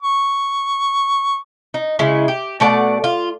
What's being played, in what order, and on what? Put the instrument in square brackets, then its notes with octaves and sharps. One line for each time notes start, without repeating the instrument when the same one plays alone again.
[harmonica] C#6
[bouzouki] D#4
C#3 G#3 E4
G4
B2 A3 D5 F#5
F4